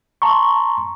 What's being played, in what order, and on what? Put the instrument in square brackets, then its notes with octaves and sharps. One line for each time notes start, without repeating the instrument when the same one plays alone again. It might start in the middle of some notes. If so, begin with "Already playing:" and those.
[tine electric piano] A5 A#5 C6 C#6